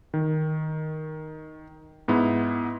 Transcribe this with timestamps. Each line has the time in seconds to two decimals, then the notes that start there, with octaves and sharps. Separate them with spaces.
0.14 D#3
2.08 G#2 B3 E4